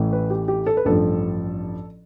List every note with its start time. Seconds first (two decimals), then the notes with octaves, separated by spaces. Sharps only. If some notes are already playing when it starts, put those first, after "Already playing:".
Already playing: A1 A2 E3 A3
0.13 B4
0.30 G4
0.48 G4
0.66 A4
0.77 B4
0.85 A1 G2 F3 A4